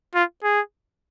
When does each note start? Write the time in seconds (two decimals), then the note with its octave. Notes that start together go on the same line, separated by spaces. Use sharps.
0.15 F4
0.44 G#4